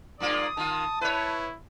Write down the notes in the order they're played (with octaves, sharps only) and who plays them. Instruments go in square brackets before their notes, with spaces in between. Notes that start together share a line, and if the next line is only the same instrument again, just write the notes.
[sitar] G2 A#3 F4 [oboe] D5 [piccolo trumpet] D#6
[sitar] D#3 F4 [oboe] A5
[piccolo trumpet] E4 [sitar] B4 C#5